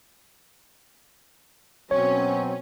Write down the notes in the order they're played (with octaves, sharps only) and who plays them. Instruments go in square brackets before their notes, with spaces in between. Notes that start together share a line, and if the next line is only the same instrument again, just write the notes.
[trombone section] B2 F#3 C4 [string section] C#4 [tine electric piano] C#5